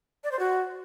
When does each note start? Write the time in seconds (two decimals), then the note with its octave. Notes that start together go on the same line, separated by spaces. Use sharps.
0.24 D5
0.32 C5
0.39 F#4